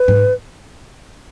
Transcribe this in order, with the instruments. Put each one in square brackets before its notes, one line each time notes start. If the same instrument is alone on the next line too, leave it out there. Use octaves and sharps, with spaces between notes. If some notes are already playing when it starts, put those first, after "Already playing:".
Already playing: [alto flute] B4
[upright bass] G#2